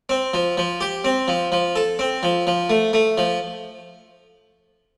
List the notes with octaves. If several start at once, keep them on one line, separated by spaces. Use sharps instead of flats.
C4
F3
F3
G4
C4
F3
F3
A4
C4
F3
F3
A3
A3
F3